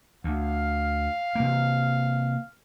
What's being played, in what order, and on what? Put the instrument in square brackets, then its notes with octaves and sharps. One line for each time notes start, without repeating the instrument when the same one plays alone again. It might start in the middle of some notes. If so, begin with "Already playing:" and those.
[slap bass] D2 [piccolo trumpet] F5
[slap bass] C3 A#3